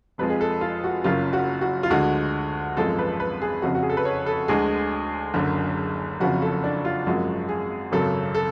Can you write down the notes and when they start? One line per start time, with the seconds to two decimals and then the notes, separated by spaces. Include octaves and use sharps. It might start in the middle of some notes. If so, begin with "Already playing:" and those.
0.18 F1 F2 F3 G#3 B4
0.30 G#4
0.41 A4
0.61 F4
0.84 F#4
1.04 F#1 F#2 C#3 F#3 F4
1.33 F#4
1.61 F#4
1.83 F4
1.90 D2 D3 G#3 F#4
2.77 G#1 F#2 F3 G#3 A4
2.99 B4
3.20 B4
3.42 G#4
3.62 F1 F2 C#3 F#4
3.75 F#4
3.83 G#4
3.89 A4
3.97 B4
4.05 C#5
4.26 A4
4.48 D2 D3 G#3 G#4
5.34 F#1 F#2 D3
6.20 F#1 F2 C#3 F3 F#4
6.42 A4
6.64 D4
6.85 F4
7.07 G#1 F#2 F3 G#3 F#4
7.49 G#4
7.92 G#1 F#2 C#3 F#3 A4
8.34 A4